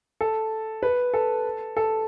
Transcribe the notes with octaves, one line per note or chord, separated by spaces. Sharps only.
A4
B4
A4
A4